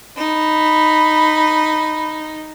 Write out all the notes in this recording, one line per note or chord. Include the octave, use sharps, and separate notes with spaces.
D#4 B5